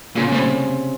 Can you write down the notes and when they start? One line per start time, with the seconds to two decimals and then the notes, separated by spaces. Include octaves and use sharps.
0.16 A#2 C#3 C#4
0.28 C#4
0.32 A2 C3 C4